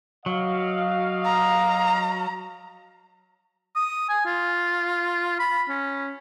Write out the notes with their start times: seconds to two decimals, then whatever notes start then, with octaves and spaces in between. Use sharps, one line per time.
0.26 F#3 D#5 F5
1.25 A#5
3.76 D#6
4.09 G#5
4.26 F4
5.39 B5
5.69 C#4